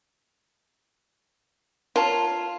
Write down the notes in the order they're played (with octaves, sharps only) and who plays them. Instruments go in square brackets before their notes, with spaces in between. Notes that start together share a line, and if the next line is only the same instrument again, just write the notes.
[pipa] F4 [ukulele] A#4 C#5 A5